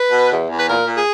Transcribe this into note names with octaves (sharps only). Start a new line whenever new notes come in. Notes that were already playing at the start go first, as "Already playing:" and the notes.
Already playing: B4
B2
E2
E2
B4
A#2 A#4
A#2
G#4